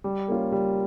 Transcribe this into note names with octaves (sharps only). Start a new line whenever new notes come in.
G3
A#3 C#4 F4
G3